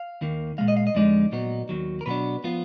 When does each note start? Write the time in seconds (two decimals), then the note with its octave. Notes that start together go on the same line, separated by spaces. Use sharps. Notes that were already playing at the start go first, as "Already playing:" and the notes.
Already playing: F5
0.21 D#2 D#3 A#3
0.58 A#2 F3 G#3 F5
0.68 D#5
0.77 F5
0.87 D#5
0.95 F2 D3 G#3 D#4 D5
1.32 A#2 F#3 B3 D#4
1.69 D#2 D#3 F#3
2.01 A#4
2.06 B2 F#3 B3 D4 B4
2.44 F3 B3 F4